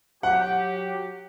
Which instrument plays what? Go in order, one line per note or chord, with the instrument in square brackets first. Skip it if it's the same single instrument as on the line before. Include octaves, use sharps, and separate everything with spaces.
[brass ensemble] F#3 G4 [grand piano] F#5